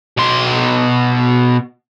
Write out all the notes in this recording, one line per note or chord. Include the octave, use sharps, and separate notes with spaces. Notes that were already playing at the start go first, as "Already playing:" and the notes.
B2 C6